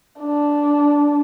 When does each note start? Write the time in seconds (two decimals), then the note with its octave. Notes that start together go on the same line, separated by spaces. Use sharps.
0.20 D4